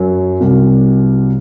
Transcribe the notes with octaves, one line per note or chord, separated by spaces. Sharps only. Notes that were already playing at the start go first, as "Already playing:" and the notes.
Already playing: F#2 F#3
C2 C3 F#3